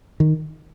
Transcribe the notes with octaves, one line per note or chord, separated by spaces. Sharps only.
D#3